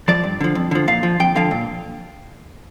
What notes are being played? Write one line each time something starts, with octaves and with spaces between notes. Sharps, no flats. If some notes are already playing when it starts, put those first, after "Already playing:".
F3 D5
G2
D3 F3
F2
D3 F3
A#2 F5
F3
F2 G5
D3 F3 F5
A#2